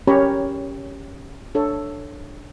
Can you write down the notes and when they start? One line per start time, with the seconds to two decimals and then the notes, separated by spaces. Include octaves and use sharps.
0.07 C#4 G4 A#4 C#5 A#5 B5
1.55 D4 A4 C#5